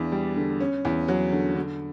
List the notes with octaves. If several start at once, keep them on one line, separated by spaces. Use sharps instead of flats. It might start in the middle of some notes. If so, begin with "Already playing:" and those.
Already playing: E2 D4
G3
D3
C#4
E2
F#3
D3
D3